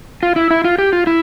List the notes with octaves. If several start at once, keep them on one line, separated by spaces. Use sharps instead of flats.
F4
E4
E4
F4
G4
F4
E4